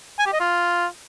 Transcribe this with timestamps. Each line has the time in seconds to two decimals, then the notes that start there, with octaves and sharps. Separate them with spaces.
0.19 G#5
0.26 G4
0.33 D#5
0.40 F4